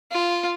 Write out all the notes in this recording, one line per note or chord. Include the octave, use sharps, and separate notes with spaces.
F4